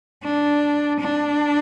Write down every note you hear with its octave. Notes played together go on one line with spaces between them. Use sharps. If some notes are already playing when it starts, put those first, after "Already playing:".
D4
D4